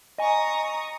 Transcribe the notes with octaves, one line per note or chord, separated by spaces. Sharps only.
D#5 G#5 A#5 C#6 D#6